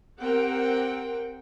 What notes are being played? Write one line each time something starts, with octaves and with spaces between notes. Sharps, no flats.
C4 G4 A#4 F#5 G5